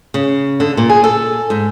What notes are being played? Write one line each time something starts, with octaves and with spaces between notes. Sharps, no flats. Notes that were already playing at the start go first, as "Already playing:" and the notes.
C#3
D3
A#2
G#4
A4
G#2